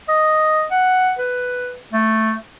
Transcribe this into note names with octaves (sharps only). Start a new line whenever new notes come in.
D#5
F#5
B4
A3